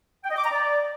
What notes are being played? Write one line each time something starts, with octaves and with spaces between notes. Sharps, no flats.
G5
D#5
D6
A#5
D5